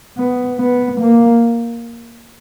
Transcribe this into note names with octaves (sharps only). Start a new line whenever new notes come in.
B3
B3
A#3